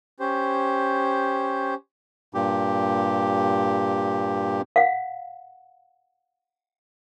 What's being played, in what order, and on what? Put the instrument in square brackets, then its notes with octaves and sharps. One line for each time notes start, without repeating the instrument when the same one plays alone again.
[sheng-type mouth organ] C#4 G4 C5
[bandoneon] G2 A#2 G4
[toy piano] F5 F#5